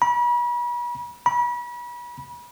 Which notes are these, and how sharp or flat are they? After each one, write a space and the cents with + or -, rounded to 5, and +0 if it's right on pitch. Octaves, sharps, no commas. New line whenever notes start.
B5 -40
B5 -35